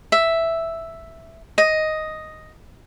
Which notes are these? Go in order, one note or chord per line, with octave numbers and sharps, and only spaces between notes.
E5
D#5